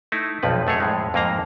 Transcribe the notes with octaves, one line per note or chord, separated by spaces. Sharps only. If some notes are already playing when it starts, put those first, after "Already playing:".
A3 D#4 E4
B1 F2 F3 B4
F#2 A3 G#4 C#5
F2 A2 G#3
F2 G#2 A#3 F5 A#5